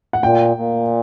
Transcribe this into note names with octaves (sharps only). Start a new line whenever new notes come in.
F#5
A#2 G5
A#2